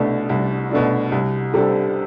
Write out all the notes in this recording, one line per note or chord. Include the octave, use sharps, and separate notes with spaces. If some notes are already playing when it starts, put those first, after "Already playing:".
Already playing: C2 B2 A3 D4
C2
B2 A3 D4
C2
C3 G3 D4 A4